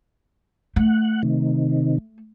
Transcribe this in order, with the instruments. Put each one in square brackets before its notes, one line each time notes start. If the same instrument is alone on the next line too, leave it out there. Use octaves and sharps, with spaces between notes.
[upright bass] A3 [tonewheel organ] F#5
[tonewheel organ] C3 D#3